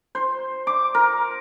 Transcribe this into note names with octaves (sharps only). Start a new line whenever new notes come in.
C5
D6
A#4